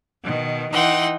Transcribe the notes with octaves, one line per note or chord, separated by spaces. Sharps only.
B2 D#3
E3 D#4 F#5 G5 C6